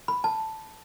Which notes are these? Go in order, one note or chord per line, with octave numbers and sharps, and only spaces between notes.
B5
A5